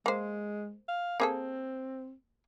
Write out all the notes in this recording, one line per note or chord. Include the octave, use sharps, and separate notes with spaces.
G#3 A#3 C5
F5
A#3 C4 G#4 A4